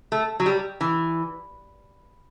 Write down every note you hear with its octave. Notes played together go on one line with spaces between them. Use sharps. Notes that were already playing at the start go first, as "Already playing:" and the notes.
A3
F#3
G3
E3